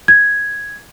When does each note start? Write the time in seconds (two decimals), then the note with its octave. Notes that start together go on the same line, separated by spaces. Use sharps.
0.08 G#6